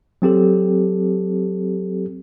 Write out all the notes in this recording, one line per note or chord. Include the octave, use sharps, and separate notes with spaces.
F#3 C4 G4 A4